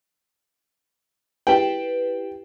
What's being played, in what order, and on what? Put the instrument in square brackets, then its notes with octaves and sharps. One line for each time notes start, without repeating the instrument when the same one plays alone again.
[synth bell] E4 G4 B4 [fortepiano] G5